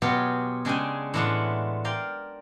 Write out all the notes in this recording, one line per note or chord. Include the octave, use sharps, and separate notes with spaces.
B2 F#3 B3 F4 G4 G#4
C#3 G#3 D4 G#4 G5 G#5
A2 E3 G#3 D4 F4 F#5
A#4 D5 F5 G5